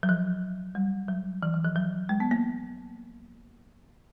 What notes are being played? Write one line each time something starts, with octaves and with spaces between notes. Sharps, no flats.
F#3
F3
G3
F#3
E3
E3
F3
F#3
G#3
B3
A#3